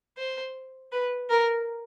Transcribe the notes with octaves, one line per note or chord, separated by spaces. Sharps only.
C5
B4
A#4